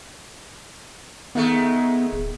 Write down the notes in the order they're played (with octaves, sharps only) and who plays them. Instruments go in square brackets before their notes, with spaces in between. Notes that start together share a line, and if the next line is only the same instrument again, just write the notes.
[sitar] D#3 G#3 A3 [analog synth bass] B3
[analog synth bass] D1